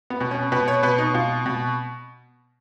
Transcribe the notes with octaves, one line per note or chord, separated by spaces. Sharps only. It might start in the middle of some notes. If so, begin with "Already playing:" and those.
B3
B2
C#4
B2 B4
C#5
B2 B4
D#4
B2 F4
B2